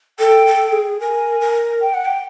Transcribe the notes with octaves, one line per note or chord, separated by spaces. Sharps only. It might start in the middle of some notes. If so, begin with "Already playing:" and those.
A4 G5
A4
G#4
A#4 G#5
A#4
G5
F#5
G5